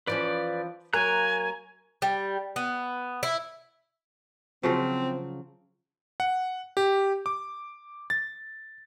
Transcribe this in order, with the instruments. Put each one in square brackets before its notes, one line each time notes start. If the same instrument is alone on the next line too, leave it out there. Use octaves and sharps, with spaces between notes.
[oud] E3 F3 C#4 [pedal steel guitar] B4 D5
[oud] F#3 A#3 A#4 [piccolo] G#5 [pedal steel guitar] A#5 F#6
[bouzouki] G3
B3
E4
[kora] C#3 F3 F#3 [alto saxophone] C4
[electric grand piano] F#5
G4
D6
A6